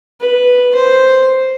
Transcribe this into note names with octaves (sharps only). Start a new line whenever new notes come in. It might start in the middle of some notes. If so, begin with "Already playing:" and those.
B4
C5